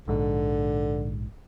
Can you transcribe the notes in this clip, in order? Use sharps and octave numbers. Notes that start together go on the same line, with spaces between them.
A#1 G#2 D3